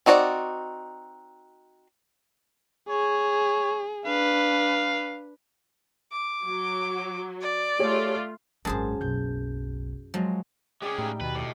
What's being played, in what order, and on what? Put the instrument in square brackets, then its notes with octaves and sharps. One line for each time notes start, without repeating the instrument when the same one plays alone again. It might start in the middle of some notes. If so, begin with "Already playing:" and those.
[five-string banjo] C4 D#4 F#4 G#4 D5
[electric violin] G#4 [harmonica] C#5
[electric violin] D4 B4 [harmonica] F5
[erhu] D6
[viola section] F#3
[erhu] D5
[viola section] A3 F4 [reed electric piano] G4 G#4 C#5
[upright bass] G#1 G#3 [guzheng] F#2 G#4 C5 [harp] A5
[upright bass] F#1 B1 [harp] G6
[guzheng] F3 [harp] F#3 G#3
[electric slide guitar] G#3 C#4 [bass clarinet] G#4 [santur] D5 G5 D6
[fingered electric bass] A2 [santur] G3 D#4 E5
[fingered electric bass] D#2 [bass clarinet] B2 [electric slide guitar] B4
[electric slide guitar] A2 [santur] D5 D#5